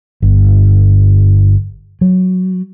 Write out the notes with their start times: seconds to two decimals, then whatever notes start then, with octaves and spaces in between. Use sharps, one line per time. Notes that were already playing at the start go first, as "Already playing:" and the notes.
0.22 G1
2.01 F#3